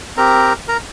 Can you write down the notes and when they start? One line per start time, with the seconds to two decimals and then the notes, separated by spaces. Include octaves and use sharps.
0.17 C4 G4 A#4 A#5
0.68 A#4 A#5